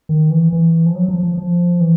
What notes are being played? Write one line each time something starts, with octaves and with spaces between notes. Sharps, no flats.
D#3
E3
E3
F3
F#3
F3
F3
F3
E3